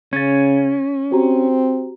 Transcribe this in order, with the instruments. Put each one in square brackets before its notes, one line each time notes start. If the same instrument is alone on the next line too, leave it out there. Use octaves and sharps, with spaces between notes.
[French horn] C#3 [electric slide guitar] C#4 [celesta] G#6 A6
[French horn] C4 [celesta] F#4 G4 A#5